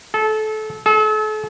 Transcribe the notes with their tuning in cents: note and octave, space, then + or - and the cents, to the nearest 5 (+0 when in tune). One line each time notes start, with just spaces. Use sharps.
A4 -25
A4 -40